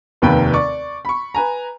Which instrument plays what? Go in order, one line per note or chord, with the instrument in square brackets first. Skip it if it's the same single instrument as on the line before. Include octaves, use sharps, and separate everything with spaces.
[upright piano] F1 D#2 C3 B4 G5
D5 C#6
B5 C#6
B4 G#5 A#5